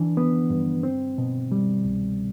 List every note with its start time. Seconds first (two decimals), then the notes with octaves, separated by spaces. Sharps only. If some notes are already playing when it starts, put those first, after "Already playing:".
Already playing: E3 D4
0.17 B3
0.50 G2
0.83 C4
1.18 B2
1.52 G3
1.84 C2